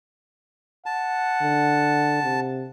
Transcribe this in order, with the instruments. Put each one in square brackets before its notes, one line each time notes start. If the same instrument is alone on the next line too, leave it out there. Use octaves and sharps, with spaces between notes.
[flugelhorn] F#5 [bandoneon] A5
[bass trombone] D3
C3